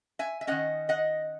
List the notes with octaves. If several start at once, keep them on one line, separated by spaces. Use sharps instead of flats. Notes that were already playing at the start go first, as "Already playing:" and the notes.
E5 G#5
E5
D#3 A#3 C#4 D#5 F#5
D#5 F#5